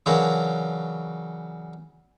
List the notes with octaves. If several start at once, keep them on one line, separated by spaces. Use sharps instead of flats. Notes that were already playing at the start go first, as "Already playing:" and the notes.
C#3 E3 F#3 D4 A#4